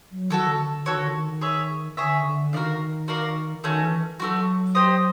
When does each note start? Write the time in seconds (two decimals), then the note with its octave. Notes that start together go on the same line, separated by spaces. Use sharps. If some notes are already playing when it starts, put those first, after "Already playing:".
0.12 F#3
0.30 D#3 F#4 A4 C#5
0.44 D#3
0.50 D3
0.68 D3
0.86 D#3 F#4 A4 C#5
0.96 D3
1.06 D#3
1.41 G#4 C#5 E5
1.97 D3 G#4 C#5 E5
2.25 D3
2.53 D#3 F#4 A#4 D5 F5
3.08 F#4 A#4 D5 F5
3.64 D#3 A3 C#4 F#4
3.82 E3
4.19 F#3 A3 C#4 F#4
4.75 G4 C5 D#5